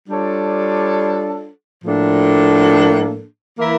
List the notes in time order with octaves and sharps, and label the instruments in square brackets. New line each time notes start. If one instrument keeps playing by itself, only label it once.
[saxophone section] G3 D4 F4 A4 C#5
A2 F3 A#3 D4 A4
E3 A#3 E4 A#4 E5